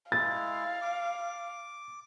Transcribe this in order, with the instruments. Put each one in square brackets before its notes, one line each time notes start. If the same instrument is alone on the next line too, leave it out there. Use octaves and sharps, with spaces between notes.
[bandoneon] G#3 E4 [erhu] F5 [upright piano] A6
[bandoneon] D6